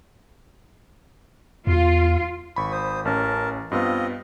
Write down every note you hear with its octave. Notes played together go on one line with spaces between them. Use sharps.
E2 F4
G#1 B5 C#6
C5 D#6
A1 C#4 A#4 A5
G2 B3 C4 F4 D#5